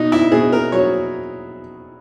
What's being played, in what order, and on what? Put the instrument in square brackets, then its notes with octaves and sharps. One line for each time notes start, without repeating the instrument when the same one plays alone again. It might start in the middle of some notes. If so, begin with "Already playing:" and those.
Already playing: [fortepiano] B2 D#4
E4
B2 G#4
A#4
F#3 C#5